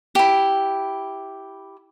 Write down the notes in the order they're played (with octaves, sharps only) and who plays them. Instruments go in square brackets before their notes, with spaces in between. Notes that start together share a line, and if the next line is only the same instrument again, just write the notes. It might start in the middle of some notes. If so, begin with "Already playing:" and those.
[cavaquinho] E4 G4